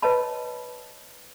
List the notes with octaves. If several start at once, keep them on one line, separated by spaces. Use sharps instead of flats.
B4 C#5 D#5 A5 B5